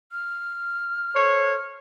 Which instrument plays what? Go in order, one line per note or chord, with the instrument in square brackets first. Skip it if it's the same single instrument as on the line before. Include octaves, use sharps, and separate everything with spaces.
[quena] F6
[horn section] A4 C5 C#5